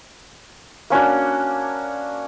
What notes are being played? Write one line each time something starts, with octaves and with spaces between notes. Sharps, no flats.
A#3 C#4 D4 F#4